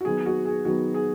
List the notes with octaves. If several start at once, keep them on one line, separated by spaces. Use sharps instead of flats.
F#4
D#3 F#3 B3 G#4
F#4
G#4
D#3 F#3 B3 F#4
G#4